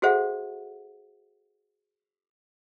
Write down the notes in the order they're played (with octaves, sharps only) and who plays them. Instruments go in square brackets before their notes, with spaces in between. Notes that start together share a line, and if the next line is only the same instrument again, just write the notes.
[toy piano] F#4 G#4 A4 C5 E5 F#5